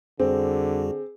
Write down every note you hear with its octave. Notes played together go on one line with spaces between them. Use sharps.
F2 D3 G3 C4 F#4 G#4